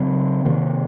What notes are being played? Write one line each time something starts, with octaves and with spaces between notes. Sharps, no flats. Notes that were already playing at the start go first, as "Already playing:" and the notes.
Already playing: C#3 F#3 C4
C3 D#3 A#3